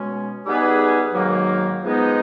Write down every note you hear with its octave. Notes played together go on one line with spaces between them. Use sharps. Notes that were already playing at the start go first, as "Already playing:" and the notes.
Already playing: B2 G#3 C#4
G3 B3 D#4 G#4 B4
G#2 D#3 F#3 A#3
F3 G#3 B3 D#4